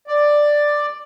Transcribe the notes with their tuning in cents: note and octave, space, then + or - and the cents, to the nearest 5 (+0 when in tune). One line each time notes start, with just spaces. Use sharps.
D5 +5